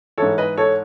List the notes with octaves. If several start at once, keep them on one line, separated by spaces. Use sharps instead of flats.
G#2 E3 A4 C#5
B4 D#5
A4 C#5